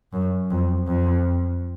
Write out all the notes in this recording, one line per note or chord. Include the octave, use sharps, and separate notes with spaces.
F#2
F2
F2